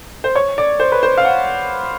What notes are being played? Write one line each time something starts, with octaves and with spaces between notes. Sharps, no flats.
C5
C#5
D5
C5
B4
C5
F5
F#5